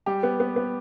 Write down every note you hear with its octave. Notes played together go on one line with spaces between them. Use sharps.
G3 G4
B3
B3
B3